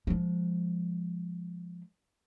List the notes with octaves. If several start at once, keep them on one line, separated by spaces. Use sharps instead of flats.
F3 G#3